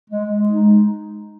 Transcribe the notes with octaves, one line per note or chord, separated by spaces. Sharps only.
G#3
G#3
D#4